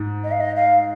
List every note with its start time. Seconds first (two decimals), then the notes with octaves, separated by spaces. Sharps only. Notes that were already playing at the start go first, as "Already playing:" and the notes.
Already playing: G#2
0.24 D#5
0.32 F5
0.40 D#5
0.56 F5